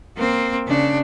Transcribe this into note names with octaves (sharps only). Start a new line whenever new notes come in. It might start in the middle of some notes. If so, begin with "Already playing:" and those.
A#3 C4
C#3 D4